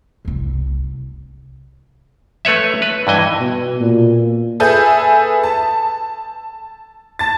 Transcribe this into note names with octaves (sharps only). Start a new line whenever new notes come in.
F#1 C2
A3 B4 C#5 E5
B4
G2 E3 D#5 G#5
B2
A#2
G#4 A4 B4 E5 G#5 G6
A5
A5 A6